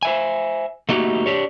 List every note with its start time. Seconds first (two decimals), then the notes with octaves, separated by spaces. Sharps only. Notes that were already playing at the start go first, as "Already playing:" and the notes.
0.03 C5 E5 G#5
0.89 A3 A#3 D#4 F#4 G4
1.26 D4 G4 C#5